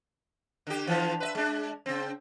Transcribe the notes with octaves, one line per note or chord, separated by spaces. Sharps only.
D3 G4
D3 E3 F3
B4 D#5 E5
G#3 D4
C#3 C4